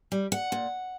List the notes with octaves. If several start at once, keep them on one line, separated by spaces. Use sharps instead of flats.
G3
F#5
A#2